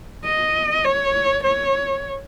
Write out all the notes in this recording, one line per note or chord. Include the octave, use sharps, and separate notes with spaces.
D#5
C#5
C#5